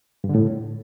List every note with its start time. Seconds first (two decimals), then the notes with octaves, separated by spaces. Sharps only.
0.24 G2
0.29 D3
0.35 A2